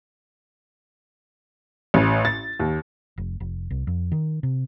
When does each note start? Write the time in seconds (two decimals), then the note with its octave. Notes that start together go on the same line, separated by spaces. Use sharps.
1.94 A1
2.25 A6
2.60 D#2
3.18 F1
3.40 F1
3.71 C2
3.87 F2
4.12 D#3
4.43 C3